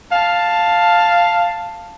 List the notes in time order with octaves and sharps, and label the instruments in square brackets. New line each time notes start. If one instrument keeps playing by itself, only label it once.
[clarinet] F5 [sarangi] A5